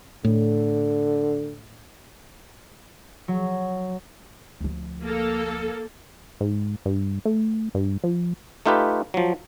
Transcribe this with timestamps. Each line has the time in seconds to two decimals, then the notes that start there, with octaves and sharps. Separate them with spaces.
0.24 A2 D3
3.28 F#3
4.61 D2 F3
5.02 A#3 A4
6.41 G#2
6.85 G2
7.25 A3
7.75 G2
8.04 F3
8.66 A3 D#4 F4 G4 B4
9.14 F3 F#3